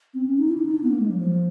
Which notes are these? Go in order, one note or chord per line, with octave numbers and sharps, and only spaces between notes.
C4
C#4
D#4
E4
D4
D#4
D4
B3
A#3
G#3
F#3
F3